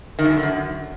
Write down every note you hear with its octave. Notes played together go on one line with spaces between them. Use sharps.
D#3
F#2
A2
D3
F#2